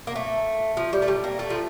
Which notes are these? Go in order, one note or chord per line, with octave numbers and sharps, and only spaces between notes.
A#3
A3
F3
G3
A3
G3
A#3
A3
F3